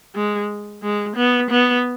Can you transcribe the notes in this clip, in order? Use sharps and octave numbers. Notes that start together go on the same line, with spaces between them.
G#3
G#3
B3
B3